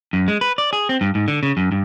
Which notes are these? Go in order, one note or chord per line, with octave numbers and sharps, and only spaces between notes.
F#2
G#3
B4
D5
G#4
C4
G2
G#2
D3
C#3
F#2
G2